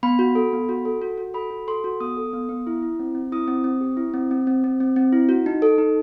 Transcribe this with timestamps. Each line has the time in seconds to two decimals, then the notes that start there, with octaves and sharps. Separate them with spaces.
0.03 B3 B5
0.19 F#4
0.35 A4
0.53 B3
0.69 F#4
0.85 A4
1.02 F#4
1.18 F#4
1.34 A4 B5
1.51 F#4
1.68 A4 C6
1.84 F#4
2.00 B3 D#6
2.17 A4
2.33 B3
2.49 B3
2.67 E4
2.82 E4
2.99 C4
3.15 C4
3.32 E4 D#6
3.48 C4
3.64 C4
3.81 G4
3.97 E4
4.14 C4
4.31 C4
4.47 C4
4.64 C4
4.80 C4
4.96 C4
5.13 E4
5.29 F#4
5.46 D#4
5.62 A4
5.78 D#4